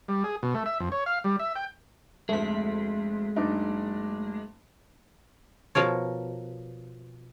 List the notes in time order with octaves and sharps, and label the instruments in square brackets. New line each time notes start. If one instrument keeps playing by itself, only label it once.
[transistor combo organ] G3
G#4
B2
A3
E5
F2
C#5
F5
G3
E5
G5
[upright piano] F1 D2 [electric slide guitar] G#3 [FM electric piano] A3 B6
[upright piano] F#1 D4 D#4
[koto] B2 F3 A#4 C#5